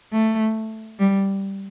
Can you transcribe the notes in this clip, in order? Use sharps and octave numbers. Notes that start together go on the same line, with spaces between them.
A3
G3